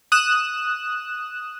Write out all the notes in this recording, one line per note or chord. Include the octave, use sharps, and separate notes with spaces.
D#6 F#6 E7